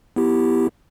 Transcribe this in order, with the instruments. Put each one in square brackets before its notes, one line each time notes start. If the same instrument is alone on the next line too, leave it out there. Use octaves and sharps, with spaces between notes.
[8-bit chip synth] B3 E4 G4